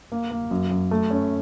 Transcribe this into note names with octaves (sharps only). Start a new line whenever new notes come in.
A#3
A#3
F#2
F#2
A3
C#4